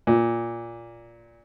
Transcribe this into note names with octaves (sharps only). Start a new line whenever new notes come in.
A#2